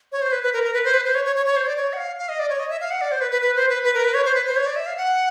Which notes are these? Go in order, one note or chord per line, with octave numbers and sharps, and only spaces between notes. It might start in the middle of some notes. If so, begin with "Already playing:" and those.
C#5
C5
B4
B4
A#4
A#4
B4
C5
B4
C5
C#5
C#5
C#5
C#5
C5
D5
C#5
F#5
F5
F5
D#5
D5
C#5
D#5
E5
F5
F#5
D5
C5
B4
B4
B4
C5
B4
B4
A#4
B4
C#5
C5
B4
C5
C#5
D5
E5
F5
F#5